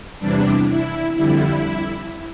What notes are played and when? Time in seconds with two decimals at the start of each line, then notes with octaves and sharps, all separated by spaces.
0.19 E2 C3 E3 G3 D4
0.68 E4
1.16 F2 D3 G3 E4